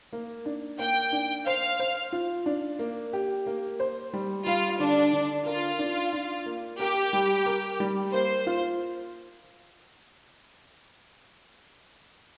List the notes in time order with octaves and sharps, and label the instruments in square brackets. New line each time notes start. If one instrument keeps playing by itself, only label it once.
[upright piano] A#3
D4
[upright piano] A#3 [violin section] G5
[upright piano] D4
[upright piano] C5 [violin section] F5
[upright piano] C5
F4
D4
A#3
G4
A#3
C5
G3
[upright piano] G3 [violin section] F4
[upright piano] D3 [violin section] D4
[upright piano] D3
[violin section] F4 [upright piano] A#4
[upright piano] D4
D4
A#3
[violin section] G4 [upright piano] A#4
[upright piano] G3
A#4
G3
[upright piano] A#3 [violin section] C5
[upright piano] F4